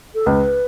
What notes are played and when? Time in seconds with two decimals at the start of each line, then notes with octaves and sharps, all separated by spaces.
0.15 A4
0.26 C#2 B4